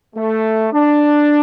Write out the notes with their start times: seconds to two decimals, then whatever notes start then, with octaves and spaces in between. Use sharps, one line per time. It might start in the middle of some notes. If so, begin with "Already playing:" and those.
0.16 A3
0.73 D4